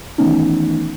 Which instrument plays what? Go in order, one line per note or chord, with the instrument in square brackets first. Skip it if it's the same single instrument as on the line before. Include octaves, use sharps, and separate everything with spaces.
[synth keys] D#3 E3 A3 B3 C#4 D#4